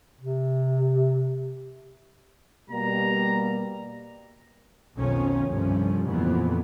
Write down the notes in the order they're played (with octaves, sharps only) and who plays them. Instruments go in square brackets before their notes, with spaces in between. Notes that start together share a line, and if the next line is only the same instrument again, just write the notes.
[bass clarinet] C3
[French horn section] B2 G3 A#3 [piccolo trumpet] A#5
[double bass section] B1 F2 D#3 F3 C#4
C2 G2 F3 A3 C#4
F2 A#2 C#3 E3 A#3 B3